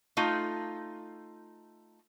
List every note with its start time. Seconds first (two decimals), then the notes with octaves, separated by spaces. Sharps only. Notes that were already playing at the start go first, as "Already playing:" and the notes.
0.17 A3 D#4 F4